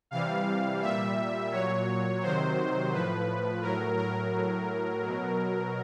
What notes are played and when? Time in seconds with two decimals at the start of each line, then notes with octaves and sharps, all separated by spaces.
0.11 C3 E3 G3 F5
0.82 A#2 G3 E5
1.52 A#2 F#3 C#5
2.22 C3 D#3 F#3 C5
2.92 A2 F3 B4
3.62 A2 F#3 A#4
3.98 A#4
4.33 A2 F#3
5.03 B2 F#3